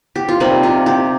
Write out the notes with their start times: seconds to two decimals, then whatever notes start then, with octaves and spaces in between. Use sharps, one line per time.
0.16 G4
0.29 F4
0.40 C3 G3 A#3 D#4
0.63 F4
0.86 G4